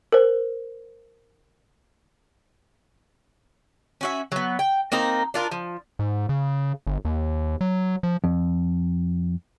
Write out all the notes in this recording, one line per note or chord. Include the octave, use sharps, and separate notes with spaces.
A#4 C5
C#4 F#4 E5
F#3 B3
G5
A#3 C4 D#4 A#5
D4 F4 A#4
F3
G#2
C#3
G1
D#2
F#3
F3
F2